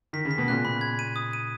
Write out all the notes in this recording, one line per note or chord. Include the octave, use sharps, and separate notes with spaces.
D#3 B6
C#3
B6
B2
A#2 C#3 F#6
B5
G#6
D#7
D#6
D#7